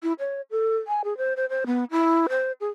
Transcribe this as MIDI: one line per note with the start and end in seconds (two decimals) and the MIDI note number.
0.03 0.13 64
0.19 0.41 73
0.51 0.76 69
0.87 1.02 80
1.04 1.17 68
1.17 1.33 72
1.36 1.46 72
1.50 1.64 72
1.66 1.84 59
1.91 2.27 64
2.29 2.52 72
2.60 2.68 68